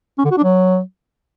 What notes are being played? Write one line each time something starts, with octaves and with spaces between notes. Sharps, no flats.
C#4
D3
F#4
D4
F#3